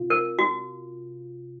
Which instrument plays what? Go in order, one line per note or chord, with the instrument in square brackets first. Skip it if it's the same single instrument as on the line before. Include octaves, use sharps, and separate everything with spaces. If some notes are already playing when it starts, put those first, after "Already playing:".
Already playing: [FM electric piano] C3 F4
[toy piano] A#4
F#4